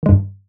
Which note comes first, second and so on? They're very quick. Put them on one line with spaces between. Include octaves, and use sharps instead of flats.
D#3 G#3 G2